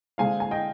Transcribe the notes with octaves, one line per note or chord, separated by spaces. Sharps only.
D3 G#3 C4 F5 G#5
G#5
D#5 G5